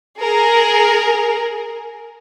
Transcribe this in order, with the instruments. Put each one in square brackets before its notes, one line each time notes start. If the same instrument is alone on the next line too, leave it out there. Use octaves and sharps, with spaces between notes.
[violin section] G#4 A#4